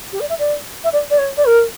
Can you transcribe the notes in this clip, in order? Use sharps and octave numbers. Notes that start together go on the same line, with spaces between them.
G4
D5
E5
D5
E5
D5
D5
C#5
D5
A#4